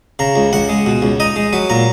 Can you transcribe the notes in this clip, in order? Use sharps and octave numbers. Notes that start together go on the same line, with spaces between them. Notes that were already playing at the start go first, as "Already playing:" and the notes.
C#3 A#5
C#2
C#2 F#5
G#3
B2
C#2
D#4 D#5
G#3
F#3 B4
A#2 A#5